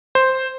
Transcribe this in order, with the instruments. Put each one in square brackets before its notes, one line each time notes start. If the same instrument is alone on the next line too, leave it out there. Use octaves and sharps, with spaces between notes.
[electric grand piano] C5